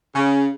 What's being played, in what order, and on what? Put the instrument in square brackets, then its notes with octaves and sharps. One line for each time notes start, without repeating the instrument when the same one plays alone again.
[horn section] C#3